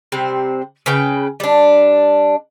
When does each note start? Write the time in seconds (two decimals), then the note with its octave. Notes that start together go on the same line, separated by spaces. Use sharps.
0.12 C3 G3 C4 C5
0.86 C#3 C#4 B4 G5
1.40 G3 D4